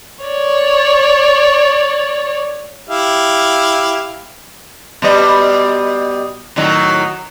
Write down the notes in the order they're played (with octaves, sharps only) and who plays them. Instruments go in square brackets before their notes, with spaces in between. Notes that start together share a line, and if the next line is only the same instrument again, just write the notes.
[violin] C#5 D5
[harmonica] E4 G4 F5
[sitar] B2 G3 D#5
A2 D#3 F#3